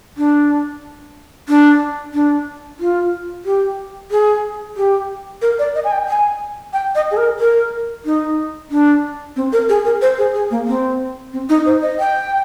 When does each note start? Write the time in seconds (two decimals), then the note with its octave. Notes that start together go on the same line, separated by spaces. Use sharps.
0.17 D4
1.49 D4
2.14 D4
2.80 F4
3.46 G4
4.11 G#4
4.77 G4
5.42 A#4
5.59 D5
5.75 D#5
5.84 G#5
5.92 G5
6.08 G#5
6.73 G5
6.95 D#5
7.11 G#4
7.17 A#4
7.39 A#4
8.05 D#4
8.71 D4
9.36 C4
9.53 A#4
9.69 G#4
9.85 A#4
10.02 C5
10.18 G#4
10.34 G#4
10.51 A#3
10.68 C4
11.33 C4
11.49 D#4
11.66 C5
11.82 D#5
11.99 G5